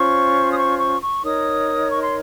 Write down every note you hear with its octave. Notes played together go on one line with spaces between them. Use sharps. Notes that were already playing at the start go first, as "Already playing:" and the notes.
Already playing: C#4 F4 C5 C#6
D#6
C#6
C#6
C#6
D#4 A#4 C#5 D#6
C#6
C6